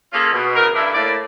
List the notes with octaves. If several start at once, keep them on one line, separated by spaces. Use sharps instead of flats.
A#3 C#4 F4 G#4 A4
B2
C#3 E3 A#4
G2 D3 D4 E4
A2 A#3 D5